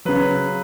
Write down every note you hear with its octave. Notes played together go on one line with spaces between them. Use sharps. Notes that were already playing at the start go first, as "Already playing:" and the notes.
C#3 F#3 B4